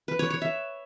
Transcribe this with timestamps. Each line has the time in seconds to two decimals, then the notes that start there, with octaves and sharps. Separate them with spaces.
0.08 B4
0.19 C#5
0.30 C#5
0.42 E5